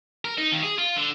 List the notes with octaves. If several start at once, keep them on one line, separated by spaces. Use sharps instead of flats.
A#4
D#4
D#2
G#4
F4
D3